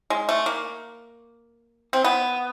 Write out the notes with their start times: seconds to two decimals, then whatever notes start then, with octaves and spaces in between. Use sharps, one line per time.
0.10 G#3
0.29 A3
0.46 A#3
1.93 C4
2.04 B3